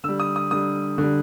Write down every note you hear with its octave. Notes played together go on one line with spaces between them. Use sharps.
D3 G3 E6
D#6
D#6
D3 G3 D#6
D3
G3